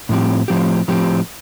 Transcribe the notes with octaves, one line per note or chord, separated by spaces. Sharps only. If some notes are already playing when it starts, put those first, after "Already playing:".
A2 F3 C4 G4
A2 F3 C4 G4
A2 F3 C4 G4